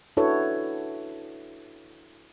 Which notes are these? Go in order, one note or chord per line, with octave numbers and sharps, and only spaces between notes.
D4 E4 F#4 A4 B4 C#5